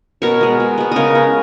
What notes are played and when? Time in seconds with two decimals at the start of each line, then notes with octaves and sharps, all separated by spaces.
0.22 B2 A#4 C#5
0.41 G#3 B3
0.60 B2
0.78 G#3 B3
0.92 C#3 A#4 C#5 D#5
1.15 G#3 B3